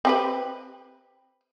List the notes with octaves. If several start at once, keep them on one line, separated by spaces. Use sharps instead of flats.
C4 G4 B4